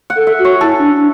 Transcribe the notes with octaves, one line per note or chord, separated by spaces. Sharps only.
F#5
A4
E5
F#4
C#5
E4 A4
D4
D4